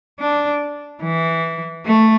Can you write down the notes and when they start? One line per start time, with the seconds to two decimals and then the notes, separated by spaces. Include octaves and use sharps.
0.20 D4
1.03 E3
1.86 A3